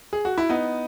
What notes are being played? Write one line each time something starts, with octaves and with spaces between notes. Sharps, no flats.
G#4
F#4
E4
B3 D#4